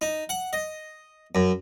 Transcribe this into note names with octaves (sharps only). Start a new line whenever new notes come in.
D#4
F#5
D#5
F#2